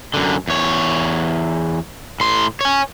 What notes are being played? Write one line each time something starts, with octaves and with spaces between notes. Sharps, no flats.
F#2 D3
E2 C#5
A2 C6
C#5 G#5